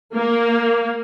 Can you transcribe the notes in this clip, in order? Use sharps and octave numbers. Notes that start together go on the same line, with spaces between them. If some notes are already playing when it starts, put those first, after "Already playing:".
A#3